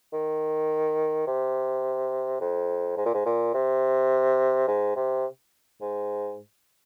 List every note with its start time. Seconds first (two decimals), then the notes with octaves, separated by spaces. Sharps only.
0.13 D#3
1.27 C3
2.40 F2
2.97 G#2
3.06 A#2
3.14 G#2
3.26 A#2
3.54 C3
4.68 G#2
4.96 C3
5.81 G#2